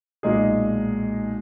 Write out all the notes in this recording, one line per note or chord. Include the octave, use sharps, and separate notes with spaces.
B1 A#2 G#3 D#4 G#4